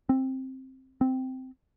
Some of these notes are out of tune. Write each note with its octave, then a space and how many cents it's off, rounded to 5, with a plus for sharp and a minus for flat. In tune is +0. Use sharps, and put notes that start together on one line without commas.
C4 +10
C4 -10